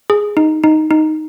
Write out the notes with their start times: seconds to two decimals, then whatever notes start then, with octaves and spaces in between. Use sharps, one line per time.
0.10 G#4
0.37 D#4
0.64 D#4
0.91 D#4